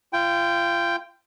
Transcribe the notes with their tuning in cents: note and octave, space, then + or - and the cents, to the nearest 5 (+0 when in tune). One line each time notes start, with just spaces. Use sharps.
F4 -30 G5 +0